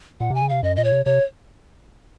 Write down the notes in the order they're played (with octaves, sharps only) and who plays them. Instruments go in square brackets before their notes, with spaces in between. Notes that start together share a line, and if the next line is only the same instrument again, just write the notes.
[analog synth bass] A#2 [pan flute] F#5
[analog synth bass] C3 [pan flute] G#5
[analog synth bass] C#3
[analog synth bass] C3 [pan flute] F5
[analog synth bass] F#2 [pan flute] D#5
[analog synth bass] A#2 [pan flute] D#5
[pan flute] C#5
[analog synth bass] C3
[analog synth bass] C3 [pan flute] C#5